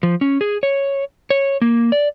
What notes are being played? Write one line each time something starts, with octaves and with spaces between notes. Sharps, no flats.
F3
C#4
G#4
C#5
C#5
A#3
D5